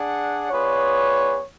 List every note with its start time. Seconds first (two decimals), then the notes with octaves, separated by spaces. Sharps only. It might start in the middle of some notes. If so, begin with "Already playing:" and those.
Already playing: D4 G#4 D5 F#5
0.50 B3 F4 G#4 B4 C#5 D5